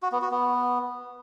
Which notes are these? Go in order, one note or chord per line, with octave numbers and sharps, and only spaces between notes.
F#4
B3
F#4
B3